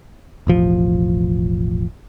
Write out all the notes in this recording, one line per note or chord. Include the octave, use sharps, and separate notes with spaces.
E1 A1 F3